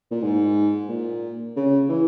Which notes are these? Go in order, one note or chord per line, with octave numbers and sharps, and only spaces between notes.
A#2
G#2
A#2
C#3
E3